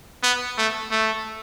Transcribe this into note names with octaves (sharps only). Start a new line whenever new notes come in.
B3
A3
A3